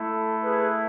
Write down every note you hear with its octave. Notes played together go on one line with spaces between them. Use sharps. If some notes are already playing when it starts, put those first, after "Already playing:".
Already playing: A3 E4
A4
G#4 B4